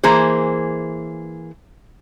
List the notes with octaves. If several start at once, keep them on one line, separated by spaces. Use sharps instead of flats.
E3 A#3 G#4 C5